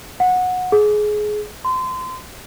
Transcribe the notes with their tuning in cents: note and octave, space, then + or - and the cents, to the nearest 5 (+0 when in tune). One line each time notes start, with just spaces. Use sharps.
F#5 -15
G#4 +20
C6 -30